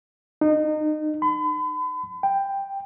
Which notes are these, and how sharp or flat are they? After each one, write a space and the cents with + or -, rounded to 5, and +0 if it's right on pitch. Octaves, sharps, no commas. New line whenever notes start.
D#4 -25
B5 +40
G5 +10